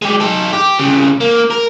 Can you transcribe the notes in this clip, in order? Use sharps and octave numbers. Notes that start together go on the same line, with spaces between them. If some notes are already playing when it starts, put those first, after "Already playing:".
G#3 G4
D#4 A4
G4
C2 C#3
A#3
A#4